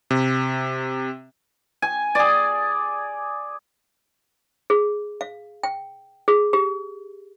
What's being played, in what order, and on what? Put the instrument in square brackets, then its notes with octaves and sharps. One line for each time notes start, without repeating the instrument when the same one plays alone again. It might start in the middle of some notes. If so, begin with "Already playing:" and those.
[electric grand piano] C3
[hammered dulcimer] G#5
G#4 D5
[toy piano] G#4
F5
G5
G#4
G4